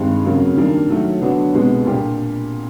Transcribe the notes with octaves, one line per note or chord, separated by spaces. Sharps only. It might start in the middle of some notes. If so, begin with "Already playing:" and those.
Already playing: G2 D#3 G#3 C4
F2 C#3 F#3 A#3
D#3 G3 A#3 D4
D#3 F#3 A3
D3 F#3 B3 D4 F#4
C2 B2 G#3 B3
A#2 G3 A#3 D4 G4